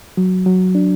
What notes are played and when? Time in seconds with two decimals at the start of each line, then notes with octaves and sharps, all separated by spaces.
0.17 F#3
0.46 F#3
0.75 D4